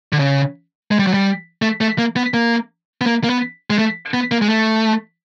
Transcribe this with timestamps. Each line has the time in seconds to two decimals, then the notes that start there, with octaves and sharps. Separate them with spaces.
0.13 D3
0.19 C#3
0.91 G#3
0.99 G3
1.07 F#3
1.14 G3
1.62 A3
1.81 A3
1.98 A#3
2.16 B3
2.34 A#3
3.01 B3
3.06 A#3
3.24 A#3
3.29 B3
3.70 G#3
3.78 A3
4.14 B3
4.31 A#3
4.41 G#3
4.49 A3